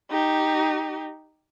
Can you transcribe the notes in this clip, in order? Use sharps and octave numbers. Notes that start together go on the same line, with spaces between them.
D#4 G4